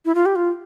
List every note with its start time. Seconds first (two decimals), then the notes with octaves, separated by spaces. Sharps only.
0.05 E4
0.15 F4
0.26 G4
0.36 F4